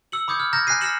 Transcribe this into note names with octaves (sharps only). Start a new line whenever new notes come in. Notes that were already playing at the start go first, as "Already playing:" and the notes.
E6 C#7 F#7
B5 D6 D#6 G6 G#6 C#7
F6
A#5 F6 G6 G#6 A#6
G#5 F#6 A#6 C7 D#7
F6 A#6 C7 C#7 E7 F#7